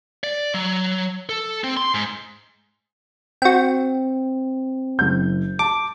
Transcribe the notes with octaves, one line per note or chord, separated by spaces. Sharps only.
D5
F#3
A4
C4
C6
G#2
C4 F#4 G5
F#1 G6
A5 D6